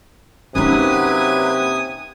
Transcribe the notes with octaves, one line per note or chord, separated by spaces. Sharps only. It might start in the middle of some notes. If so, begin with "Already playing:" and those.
C3 F#3 A#3 C#4 D#4 B4 G#5 D#6